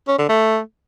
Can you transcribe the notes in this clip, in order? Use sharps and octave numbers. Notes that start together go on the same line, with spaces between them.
C#4
D3
A3